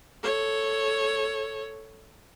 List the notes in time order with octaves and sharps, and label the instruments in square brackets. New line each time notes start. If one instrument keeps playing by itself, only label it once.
[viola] A4 C#5